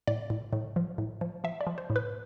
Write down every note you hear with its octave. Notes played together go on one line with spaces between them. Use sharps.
A2 D5
A2
A2
F3
A2
F3
F3 E5
D5
F3
C5
A2
B4